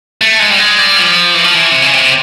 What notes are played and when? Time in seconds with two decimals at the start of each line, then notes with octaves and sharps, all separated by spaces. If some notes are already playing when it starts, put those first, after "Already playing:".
0.21 A3
0.39 G#3
0.50 G3
0.59 G#3
0.78 G3
0.96 F3
1.34 E3
1.44 F3
1.54 E3
1.71 C3
1.82 C#3
1.93 C3